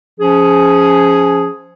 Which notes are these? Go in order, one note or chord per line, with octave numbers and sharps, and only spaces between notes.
F3 C#4 G#4